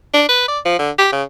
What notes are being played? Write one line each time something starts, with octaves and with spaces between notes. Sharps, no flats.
D4
B4
D5
F3
D3
G4
C#3